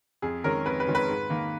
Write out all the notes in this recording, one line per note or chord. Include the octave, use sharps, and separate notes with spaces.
F2 G#4
D#3 G#3 C#4 A#4
F2 B4
B4
D#3 G#3 C#4
B4
G#2
D#3 A#3